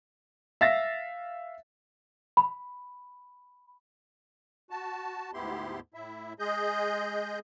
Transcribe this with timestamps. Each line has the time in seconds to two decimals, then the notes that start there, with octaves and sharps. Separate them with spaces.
0.61 E5 F5 A6 A#6
2.37 B5
4.70 F#4 A5
5.33 D2 G#2 B3 E4 G4 C6
5.94 A2 E4 E5
6.39 G#3 G#4 D#5 G6